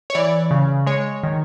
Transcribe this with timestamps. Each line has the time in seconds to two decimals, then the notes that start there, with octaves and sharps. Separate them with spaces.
0.10 C#5
0.15 E3 D5
0.51 C#3
0.86 G#3 C#5
1.23 D#3